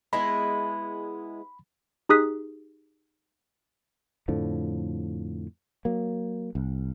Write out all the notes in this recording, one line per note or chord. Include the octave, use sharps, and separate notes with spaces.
G#3 B3 E4 B5
D#4 G4 G#4 D#6 F#6 B6
F2 A2 D3 F3
F#3 A#3
C2